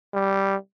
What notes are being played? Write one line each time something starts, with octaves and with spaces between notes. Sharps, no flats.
G3